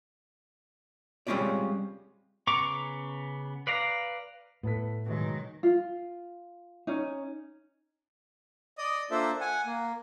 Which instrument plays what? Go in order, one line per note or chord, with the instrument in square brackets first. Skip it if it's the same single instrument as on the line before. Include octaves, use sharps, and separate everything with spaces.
[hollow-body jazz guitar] G3 G#3 C4 C#4 F4 D5
[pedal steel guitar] C#3 B3 A#5 C#6 D6
B4 D5 F5 A#5
[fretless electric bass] A2 [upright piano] B3 A4 B6
[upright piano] B2 F#3 G#3 [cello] D#3
[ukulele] F4
C#4 D#4
[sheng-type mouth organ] D5 D#5 D#6
A#3 D4 F4 A4 C5 E5
F#5 G#5
A#3